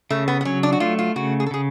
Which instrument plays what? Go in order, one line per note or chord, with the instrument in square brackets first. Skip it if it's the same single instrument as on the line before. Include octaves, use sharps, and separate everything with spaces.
[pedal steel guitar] C#3 [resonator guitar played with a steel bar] A3
[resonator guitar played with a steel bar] B3
B3
[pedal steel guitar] F#3 [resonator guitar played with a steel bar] C#4
[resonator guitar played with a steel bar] D4
F#4
[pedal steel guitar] A3 [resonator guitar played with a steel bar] F4
[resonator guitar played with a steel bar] F4
[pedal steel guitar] C#3 [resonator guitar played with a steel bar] F#4
[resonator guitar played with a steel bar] G#4
A4
[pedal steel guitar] C#3 [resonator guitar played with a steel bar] G#4